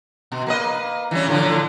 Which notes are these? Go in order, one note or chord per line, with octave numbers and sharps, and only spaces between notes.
B2
A#3 B4 D#5
E3 G3 C#4
A2 D3 F3